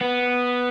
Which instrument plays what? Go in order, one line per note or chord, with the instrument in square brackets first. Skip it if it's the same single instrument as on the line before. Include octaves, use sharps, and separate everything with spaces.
[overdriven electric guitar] B3